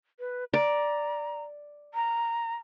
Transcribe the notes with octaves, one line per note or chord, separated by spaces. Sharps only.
B4
D5 A#5
A#5